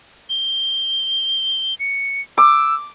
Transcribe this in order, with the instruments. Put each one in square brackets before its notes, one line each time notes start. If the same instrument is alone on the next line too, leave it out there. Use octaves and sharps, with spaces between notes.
[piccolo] G7
C#7
[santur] D6 [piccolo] E6